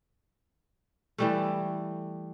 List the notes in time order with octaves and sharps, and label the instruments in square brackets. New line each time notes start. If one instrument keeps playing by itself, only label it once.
[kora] E3 G3 A3